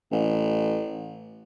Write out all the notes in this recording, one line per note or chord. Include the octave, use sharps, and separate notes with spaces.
A1